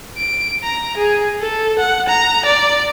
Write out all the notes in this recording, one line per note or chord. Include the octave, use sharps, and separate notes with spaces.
D7
A#5
G#4
A4
F#5
A#5
D5